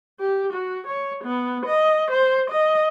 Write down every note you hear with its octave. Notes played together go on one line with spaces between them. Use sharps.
G4
F#4
C#5
B3
D#5
C5
D#5